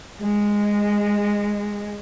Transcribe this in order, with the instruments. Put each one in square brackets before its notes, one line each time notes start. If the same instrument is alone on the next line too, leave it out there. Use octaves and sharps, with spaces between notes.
[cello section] G#3